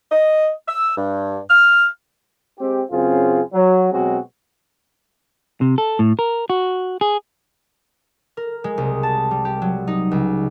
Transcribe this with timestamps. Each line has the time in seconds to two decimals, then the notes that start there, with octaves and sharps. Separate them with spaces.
0.11 D#5
0.67 E6
0.97 G2
1.50 F6
2.59 G#3 C4 G4
2.91 F#2 C#3 C4 F4 G#4
3.53 F#3
3.92 B2 F#3 G#3 C4 F#4
5.61 C3
5.78 A4
5.99 A2
6.19 A#4
6.50 F#4
7.01 G#4
8.37 A#4
8.64 G#3
8.78 C2
9.03 A5
9.31 G3
9.45 G4
9.62 F#3
9.88 D#4
10.11 C#2